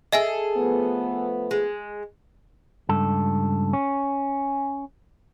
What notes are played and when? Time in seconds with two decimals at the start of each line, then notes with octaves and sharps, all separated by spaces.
0.13 G#4 A4 D#5 E5 G#5
0.57 F3 A3 B3
1.51 G#3
2.89 C#2 G2 A4
3.73 C#4